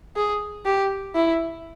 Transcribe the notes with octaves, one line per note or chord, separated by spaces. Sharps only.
G#4
G4
E4